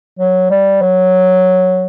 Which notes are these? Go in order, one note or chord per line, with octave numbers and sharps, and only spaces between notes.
F#3
G3
F#3